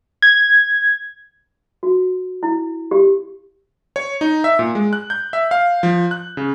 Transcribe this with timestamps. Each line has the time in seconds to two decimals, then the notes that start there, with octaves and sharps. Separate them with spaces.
0.22 G#6
1.83 F#4
2.43 E4
2.91 G4
3.96 C#5
4.21 D#4
4.44 E5
4.59 A#2
4.75 G#3
4.93 F#6
5.10 G6
5.33 E5
5.51 F5
5.83 F3
6.11 F#6
6.37 C#3